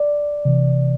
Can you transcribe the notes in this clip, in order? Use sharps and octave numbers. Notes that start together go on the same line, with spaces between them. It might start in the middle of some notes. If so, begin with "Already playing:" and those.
Already playing: D5
C3 E3